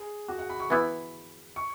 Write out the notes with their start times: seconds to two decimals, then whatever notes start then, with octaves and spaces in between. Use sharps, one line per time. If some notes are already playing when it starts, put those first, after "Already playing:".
Already playing: G#4
0.28 F#4
0.39 F#5
0.50 B5
0.60 C#6
0.70 E3 B3 E4 B5
1.56 C#6